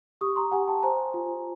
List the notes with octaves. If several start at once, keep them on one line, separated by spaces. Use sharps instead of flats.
G4 C#6 D#6
A#5 C6
G4 F#5 G#5
G5 A5
A5
C5 G#5 A#5
F4